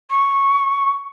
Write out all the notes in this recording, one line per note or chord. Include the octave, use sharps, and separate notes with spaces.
C#6